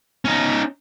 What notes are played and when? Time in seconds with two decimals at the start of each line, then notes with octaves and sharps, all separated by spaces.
0.25 C#4 D#4